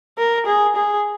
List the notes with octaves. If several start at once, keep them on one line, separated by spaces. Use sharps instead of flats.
A#4
G#4
G#4